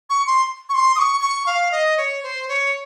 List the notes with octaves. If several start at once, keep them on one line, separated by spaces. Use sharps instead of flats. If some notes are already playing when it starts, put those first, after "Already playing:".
C#6
C6
C#6
C6
D#6
C#6
C#6
F5
D#5
C#5
C5
C#5